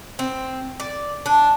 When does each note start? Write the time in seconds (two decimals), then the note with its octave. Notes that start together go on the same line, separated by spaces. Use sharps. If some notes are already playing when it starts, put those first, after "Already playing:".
0.19 C4
0.80 D5
1.26 D4